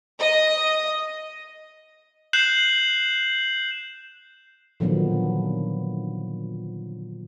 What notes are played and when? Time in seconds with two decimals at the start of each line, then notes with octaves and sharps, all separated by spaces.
0.20 D#5
2.33 F#6 G6 C7 E7 F#7
4.80 A#2 D3 D#3 F3 F#3 B3